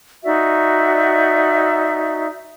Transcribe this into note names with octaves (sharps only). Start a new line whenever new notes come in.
D#4 F#4 D5 E5